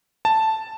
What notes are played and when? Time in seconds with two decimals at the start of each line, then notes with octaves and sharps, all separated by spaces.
0.25 A5